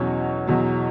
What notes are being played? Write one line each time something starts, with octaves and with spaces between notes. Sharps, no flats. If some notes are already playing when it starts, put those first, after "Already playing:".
Already playing: E2 B2 F#3 C#4 C#5
E2 B2 F#3